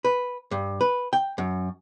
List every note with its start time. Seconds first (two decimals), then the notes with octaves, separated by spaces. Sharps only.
0.04 B4
0.51 G2
0.81 B4
1.13 G5
1.38 F#2